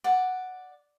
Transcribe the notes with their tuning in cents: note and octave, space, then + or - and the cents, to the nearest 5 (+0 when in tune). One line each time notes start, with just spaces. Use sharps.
D5 +0 F#5 +0